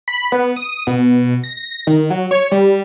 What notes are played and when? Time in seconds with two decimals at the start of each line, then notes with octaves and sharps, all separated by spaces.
0.08 B5
0.32 B3
0.56 D#6
0.87 B2
1.44 A#6
1.87 D#3
2.10 F#3
2.31 C#5
2.52 G3